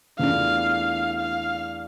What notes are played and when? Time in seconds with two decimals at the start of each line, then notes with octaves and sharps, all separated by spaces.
0.19 E2 E3 A3 D4 F4 F5
1.20 F5